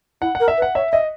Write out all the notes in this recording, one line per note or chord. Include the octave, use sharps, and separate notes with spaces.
E4 F#5
F#5
A#4
E5
B4
F#5
C#5 E5
D#5 E5